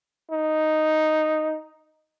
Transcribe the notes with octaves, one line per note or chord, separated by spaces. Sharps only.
D#4